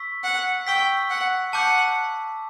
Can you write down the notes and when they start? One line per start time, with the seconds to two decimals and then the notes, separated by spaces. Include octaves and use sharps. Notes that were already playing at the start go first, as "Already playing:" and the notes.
Already playing: C#6 E6 B6
0.24 F#5
0.67 G5 C#6 E6 B6
1.10 F#5
1.53 F#5 A5 D6 G6